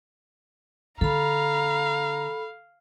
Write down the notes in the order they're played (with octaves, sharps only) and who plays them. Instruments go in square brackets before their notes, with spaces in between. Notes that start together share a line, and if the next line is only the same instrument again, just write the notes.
[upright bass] D3 [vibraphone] A4 B5 [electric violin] F5 [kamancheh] A#5